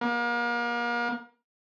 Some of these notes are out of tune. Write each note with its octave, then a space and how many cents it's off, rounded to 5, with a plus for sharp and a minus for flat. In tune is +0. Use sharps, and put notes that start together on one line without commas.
A#3 +35